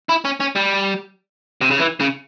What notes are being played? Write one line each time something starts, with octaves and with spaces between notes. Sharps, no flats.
E4
C#4
C#4
G3
C3
C#3
E3
C#3